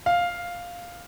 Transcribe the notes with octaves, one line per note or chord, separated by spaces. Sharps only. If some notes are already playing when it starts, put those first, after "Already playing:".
F5